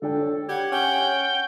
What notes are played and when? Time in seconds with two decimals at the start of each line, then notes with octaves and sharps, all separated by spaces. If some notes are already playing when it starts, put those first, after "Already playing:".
0.02 D3 D4 A4 G5
0.21 C#5
0.49 G4 F#5 G#6
0.71 C#4 G5